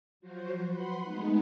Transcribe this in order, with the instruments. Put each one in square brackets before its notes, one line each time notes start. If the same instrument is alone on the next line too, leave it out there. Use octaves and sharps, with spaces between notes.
[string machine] F3 F#3 F#4 C5
B4 F#5 B5 C6
G#3 A3 B3 D#4